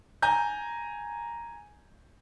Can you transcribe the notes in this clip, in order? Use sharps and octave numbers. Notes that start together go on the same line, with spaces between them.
G#5 A#5 G6